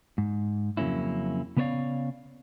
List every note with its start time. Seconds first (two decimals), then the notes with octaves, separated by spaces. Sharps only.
0.18 G#2
0.77 F2 C#3 F#3 A#3 C#4 E4
1.57 C#3 B3 B4 C#5 D5 F5